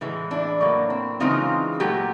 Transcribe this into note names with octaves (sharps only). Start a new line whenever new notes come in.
A2 E3 G#3
D4 E4
A2 F#3 A#3
C4
C#3 E3 G#3 C4 D#4 F4
A#2 F#3 A3 G4